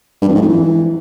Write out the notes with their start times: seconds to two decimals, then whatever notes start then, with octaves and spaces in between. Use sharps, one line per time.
0.21 G2
0.28 F2
0.35 G#2
0.42 F2
0.48 E3